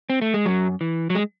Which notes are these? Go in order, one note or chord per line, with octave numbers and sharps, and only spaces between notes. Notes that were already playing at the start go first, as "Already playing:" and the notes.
C4
A3
G#3
F#2 F#3
E3
F#3
G#3